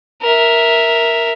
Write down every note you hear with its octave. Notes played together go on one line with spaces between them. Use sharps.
A#4 E5